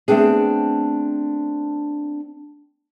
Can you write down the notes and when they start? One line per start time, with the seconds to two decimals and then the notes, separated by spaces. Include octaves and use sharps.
0.08 A3 B3 C4 D4 G#4